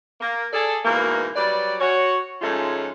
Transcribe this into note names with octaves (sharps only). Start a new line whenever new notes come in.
A#3
G#4 A4 D5
G#2 B2 E3 A#3
F#3 G3 B4 D5
F#4 C#5
G#2 F3 G#3 A3 C#4 F4